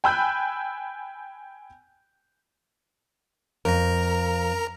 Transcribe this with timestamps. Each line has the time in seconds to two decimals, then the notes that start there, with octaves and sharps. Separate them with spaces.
0.04 G5 G#5 B5 E6 F#6 G6
3.65 F2 A#4 A#5